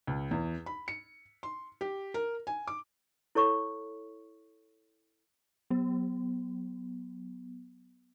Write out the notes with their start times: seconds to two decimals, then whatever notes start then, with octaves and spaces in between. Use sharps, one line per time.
0.07 C#2
0.31 E2
0.66 B5
0.88 C#7
1.43 C6
1.81 G4
2.14 A#4
2.47 G#5
2.67 D6
3.35 E4 A4 C#5 C#6
5.70 F#3 B3